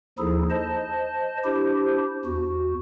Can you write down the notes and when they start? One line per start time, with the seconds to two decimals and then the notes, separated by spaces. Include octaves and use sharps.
0.19 D#2 F3 D#4 E4 G#4 A4
0.50 C5 D#5 A5
1.45 D4 E4 G4 C5
2.25 E2 F#4